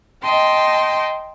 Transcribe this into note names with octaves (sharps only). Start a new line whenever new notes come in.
D#5 G5 A5 C6